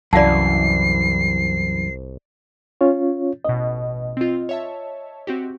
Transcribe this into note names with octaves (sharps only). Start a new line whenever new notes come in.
C2 F#2 E3 D5 F5 A5 C7
C#4 F4 C#5
A1 B2 D#5
C4 F4
C#5 E5 A5
C4 F#4 G4